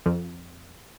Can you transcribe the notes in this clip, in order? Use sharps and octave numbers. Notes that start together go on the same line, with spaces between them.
F2